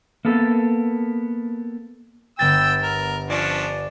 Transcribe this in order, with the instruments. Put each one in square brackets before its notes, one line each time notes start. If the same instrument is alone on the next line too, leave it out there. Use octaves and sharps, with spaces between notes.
[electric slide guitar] A#3 B3 A4
[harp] G1 B3 A6 [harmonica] G5 E6
[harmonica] A#4
[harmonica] F3 C#4 D4 [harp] D5